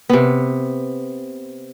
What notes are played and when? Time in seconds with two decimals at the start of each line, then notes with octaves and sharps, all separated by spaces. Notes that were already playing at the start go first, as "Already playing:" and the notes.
0.09 C3 B3